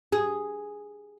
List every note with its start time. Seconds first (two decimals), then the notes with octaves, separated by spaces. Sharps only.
0.12 G#4